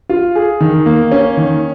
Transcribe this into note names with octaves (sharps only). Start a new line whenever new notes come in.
F4
G#4
D#3
A#3
C#4
D#3